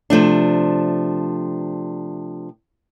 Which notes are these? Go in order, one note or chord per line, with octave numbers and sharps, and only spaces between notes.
C3 F3 A3 D4